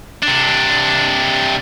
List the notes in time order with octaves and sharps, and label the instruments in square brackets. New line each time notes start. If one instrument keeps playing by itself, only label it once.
[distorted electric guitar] C3 D4